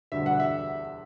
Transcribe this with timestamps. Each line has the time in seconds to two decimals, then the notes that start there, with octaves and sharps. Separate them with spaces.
0.12 E1 D2 D3 G3 E5
0.26 F#5
0.40 E5